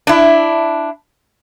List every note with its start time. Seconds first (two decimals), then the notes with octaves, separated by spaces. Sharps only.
0.07 D4 E4